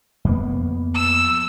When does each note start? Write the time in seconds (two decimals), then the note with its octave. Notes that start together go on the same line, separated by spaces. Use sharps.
0.25 F2 A#3 B3
0.95 E6